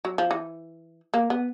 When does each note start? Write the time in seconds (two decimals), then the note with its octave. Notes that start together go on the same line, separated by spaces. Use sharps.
0.05 F#3
0.18 F3
0.31 E3
1.14 A#3
1.30 B3